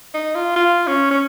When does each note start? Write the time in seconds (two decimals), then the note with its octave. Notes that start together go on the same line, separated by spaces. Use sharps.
0.14 D#4
0.35 F4
0.56 F4
0.87 C#4
1.11 C#4